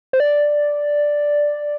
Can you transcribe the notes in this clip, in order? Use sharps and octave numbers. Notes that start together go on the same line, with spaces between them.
C5
D5